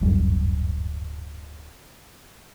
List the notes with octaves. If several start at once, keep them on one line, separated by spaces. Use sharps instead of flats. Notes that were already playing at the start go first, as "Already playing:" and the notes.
D1 G1 F#2 G3